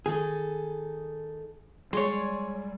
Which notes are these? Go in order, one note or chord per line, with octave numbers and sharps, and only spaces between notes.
D#3 G#4 A4
G3 G#3 G#4 C#5 D5 C6